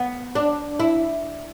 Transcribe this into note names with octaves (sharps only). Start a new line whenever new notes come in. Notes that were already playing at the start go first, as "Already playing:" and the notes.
Already playing: B3
D4
E4